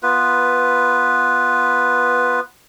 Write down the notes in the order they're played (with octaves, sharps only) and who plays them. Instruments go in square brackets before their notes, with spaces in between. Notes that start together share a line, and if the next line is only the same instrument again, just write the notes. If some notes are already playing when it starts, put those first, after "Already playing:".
[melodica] B3 F4 B4